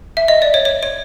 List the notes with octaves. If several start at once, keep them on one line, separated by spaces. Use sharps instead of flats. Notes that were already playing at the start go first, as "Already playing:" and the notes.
E5
D#5
D5
C#5
C#5
C#5